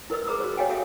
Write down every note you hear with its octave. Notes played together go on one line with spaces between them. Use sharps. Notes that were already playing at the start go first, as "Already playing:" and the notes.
E4 A#4 B4 D#5 E6
G#4 B4 A#5 D#6 E6
F#4 C5
G4 C#5 D#5 F5 G5 G#5
F#4 A4 C#5 E5 F5 D#6